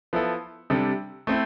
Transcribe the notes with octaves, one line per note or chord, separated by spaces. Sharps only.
F3 B3 E4 A4
C3 G3 D4 A4
A3 C4 E4